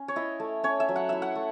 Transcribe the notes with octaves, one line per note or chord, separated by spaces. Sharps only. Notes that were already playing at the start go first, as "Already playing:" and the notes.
Already playing: C#4
C#5
E4 D#5
A3
C#4 C#5
E5
F#3
F#5
E4 E5
F#5
A3